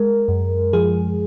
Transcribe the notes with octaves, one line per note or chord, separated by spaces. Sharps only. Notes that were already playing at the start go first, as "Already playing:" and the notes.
Already playing: G#3 A#4
F#2
F3 G#4